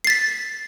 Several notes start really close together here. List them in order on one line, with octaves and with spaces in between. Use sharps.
C7 A6 B6